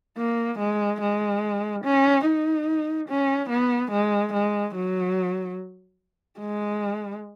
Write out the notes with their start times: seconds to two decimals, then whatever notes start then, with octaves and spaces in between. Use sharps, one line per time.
0.18 A#3
0.59 G#3
1.01 G#3
1.84 C#4
2.26 D#4
3.09 C#4
3.50 B3
3.92 G#3
4.33 G#3
4.75 F#3
6.40 G#3